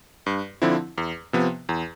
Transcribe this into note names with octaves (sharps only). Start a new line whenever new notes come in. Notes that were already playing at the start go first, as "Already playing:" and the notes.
G2
D3 F3 C4 E4
E2
C3 F3 B3
E2